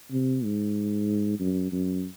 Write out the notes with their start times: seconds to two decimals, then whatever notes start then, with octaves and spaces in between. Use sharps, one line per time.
0.12 C3
0.45 G#2
1.39 F#2
1.72 F#2